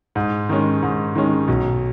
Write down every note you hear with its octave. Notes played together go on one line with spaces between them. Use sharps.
G#2
D#3 G#3 C#4
G#2
D#3 G#3 C#4
B1